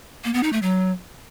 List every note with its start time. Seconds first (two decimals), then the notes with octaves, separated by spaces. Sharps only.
0.24 A#3
0.34 B3
0.43 D#4
0.53 A3
0.62 F#3